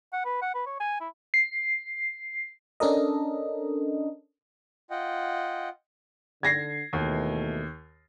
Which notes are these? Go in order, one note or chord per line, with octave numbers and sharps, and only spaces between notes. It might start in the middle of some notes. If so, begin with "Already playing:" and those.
F#5
B4
F#5
B4
C#5
G#5
E4
C7
C#4 D4 A4 A#4 D#5
F4 D#5 F#5 G5
D3 G#6 A#6 C7
D#2 B2 E3 A3